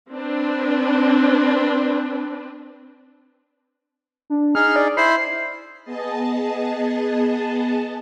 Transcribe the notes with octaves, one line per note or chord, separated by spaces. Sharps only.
C4 D4 B4
D4
D#4 G#4 F6
D5
E4 C5 B5 C7
B3 G#4 D#5 A5